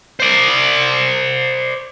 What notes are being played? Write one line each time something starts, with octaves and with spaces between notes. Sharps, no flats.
C5 D5